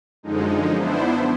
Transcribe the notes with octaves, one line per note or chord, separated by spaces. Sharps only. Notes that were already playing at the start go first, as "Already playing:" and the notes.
F#2 D3 F3 G#3 D#4
B3 D4 E4 C5